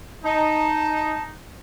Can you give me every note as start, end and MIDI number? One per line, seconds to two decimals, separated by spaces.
0.24 1.34 63
0.24 1.23 81